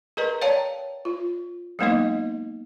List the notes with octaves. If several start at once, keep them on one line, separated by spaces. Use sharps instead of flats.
G#4 A#4 B4 D#5 A#5
C#5 D5 F5 G5 A5 A#5
F4
F#3 G#3 A#3 B3 D#4 D#5